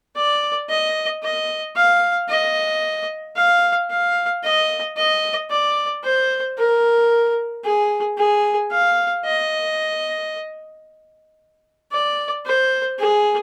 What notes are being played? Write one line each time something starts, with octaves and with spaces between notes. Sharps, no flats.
D5
D#5
D#5
F5
D#5
F5
F5
D#5
D#5
D5
C5
A#4
G#4
G#4
F5
D#5
D5
C5
G#4